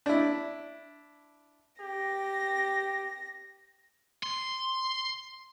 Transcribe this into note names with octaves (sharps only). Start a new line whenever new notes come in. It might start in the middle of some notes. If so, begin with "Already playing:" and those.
D4 E4
G4 A#6
C6